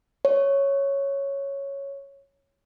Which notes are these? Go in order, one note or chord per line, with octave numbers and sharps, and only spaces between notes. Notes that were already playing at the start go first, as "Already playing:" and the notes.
C#5